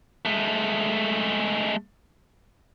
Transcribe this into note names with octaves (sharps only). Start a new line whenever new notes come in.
G#3 A3